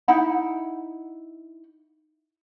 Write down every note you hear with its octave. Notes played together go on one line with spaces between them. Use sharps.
D#4 E4 F#5 B5